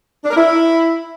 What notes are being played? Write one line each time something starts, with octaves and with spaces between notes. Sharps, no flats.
D4
A#4
E4